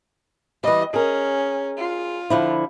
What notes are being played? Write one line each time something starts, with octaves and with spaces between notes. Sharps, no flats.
E3 G3 D#5
C#4 G#4 A#4
F4
D3 F3 E4